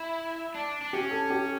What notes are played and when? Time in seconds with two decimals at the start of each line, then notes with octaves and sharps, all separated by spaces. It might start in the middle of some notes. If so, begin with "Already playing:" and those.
Already playing: E4
0.54 D4
0.81 D4
0.93 C#4 G4
1.11 A4
1.30 G4